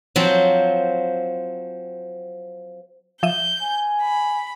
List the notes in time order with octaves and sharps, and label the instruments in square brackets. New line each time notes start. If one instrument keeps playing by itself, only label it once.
[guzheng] F3 F#3 C4
[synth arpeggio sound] F3 E5 D#7 [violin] G6
[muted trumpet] G#5
[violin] B5